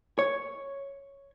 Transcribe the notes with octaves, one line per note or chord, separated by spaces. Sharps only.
C#5